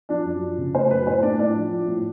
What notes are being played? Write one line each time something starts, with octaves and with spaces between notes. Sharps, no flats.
F3 D4 D5
F#2
F3
C#3
A3 C5
F#2 B4
A2 C5
A3 D4 D5
A2 D4 D5
F3
F3
A2